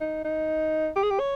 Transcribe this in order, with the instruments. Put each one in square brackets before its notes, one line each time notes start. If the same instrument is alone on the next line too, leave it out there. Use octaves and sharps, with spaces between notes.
[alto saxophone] D#4
D#4
G4
G#4
G4
C#5